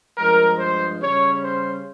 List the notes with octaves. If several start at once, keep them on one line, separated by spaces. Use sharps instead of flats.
G2 F3 G#3 A#4
C5
C#3 G3 C#4 C#5
C5